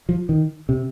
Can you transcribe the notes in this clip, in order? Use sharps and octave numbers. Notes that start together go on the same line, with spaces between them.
F3
D#3
C3